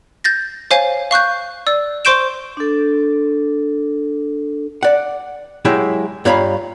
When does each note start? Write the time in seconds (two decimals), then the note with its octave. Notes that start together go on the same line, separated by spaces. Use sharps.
0.24 G6 A6 A#6
0.71 C5 C#5 F5 G#5
1.11 F5 C#6 F#6 G6
1.67 D5 E6
2.05 C5 C6 C#6 G6 D7 E7
2.57 D4 A4
4.83 D5 F#5
5.65 F#3 G#3 E4 G4
6.25 G2 F4 C#5 F5 A#5 B5